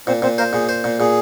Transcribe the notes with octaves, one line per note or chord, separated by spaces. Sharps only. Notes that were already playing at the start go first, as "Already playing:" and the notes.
A#2 C4 C5
A#2 C4 C5
A#3 A#4 C5
A#2 G#4
C5
A#2
A#2 G#4